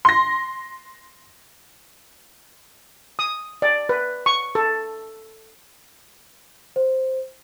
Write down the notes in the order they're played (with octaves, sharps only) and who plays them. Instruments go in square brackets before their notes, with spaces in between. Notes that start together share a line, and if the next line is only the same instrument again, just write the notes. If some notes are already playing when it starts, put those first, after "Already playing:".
[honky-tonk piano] C6 A#6
[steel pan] D#6
D5
B4
C#6
A4
[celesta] C5